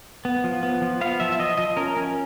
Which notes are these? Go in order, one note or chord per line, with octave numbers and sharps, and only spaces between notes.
B3
F3
B3
F3
B3 F5
F3 E5
E5
F3 D#5
F3 D#5
C#4 A#4
C#4